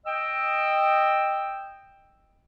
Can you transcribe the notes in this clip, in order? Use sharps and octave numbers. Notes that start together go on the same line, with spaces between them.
D#5 G5 E6